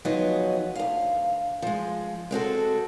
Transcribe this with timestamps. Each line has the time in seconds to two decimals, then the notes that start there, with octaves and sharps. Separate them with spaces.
0.05 D#3 F3 F#3 G#3 B3 D#5
0.75 D2 F5
1.62 F3 G#3
2.31 G#3 C4 F#4 A4